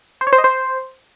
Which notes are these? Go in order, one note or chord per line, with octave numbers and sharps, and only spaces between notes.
C5
C#5
C5
D#5
C5